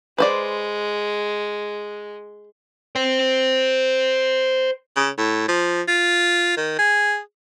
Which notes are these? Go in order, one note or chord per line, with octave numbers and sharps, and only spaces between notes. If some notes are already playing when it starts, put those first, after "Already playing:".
G#3 B4 C5 D5
C5 G5
C#3
A2
F3
F4
D#3
G#4